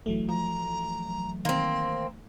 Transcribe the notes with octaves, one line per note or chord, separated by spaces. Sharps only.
F1 E3 F#3 A3
F3 A#5
D#3 A#3 C4 C6